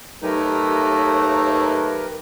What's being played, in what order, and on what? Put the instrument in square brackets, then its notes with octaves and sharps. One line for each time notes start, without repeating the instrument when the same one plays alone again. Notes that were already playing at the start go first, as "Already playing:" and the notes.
[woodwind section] D#2 F#3 D#4 [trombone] A3 [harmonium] G4 A#4 B4